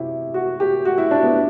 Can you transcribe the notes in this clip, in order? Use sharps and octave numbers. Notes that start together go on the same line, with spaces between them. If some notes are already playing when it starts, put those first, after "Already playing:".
Already playing: C3 E4 F#4 G4
F#4
G4
F#4
E4
D4
B3